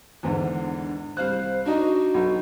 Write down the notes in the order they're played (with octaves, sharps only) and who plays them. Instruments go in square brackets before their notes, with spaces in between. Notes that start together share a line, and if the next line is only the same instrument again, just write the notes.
[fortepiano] E2 G#2 D3 [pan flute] D4
[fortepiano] C2 F5 F#6 [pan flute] C5
[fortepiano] D4 D#4 D#5 [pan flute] F#4
[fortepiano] B1